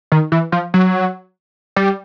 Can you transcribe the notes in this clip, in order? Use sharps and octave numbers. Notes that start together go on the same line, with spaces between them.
D#3
E3
F3
F#3
G3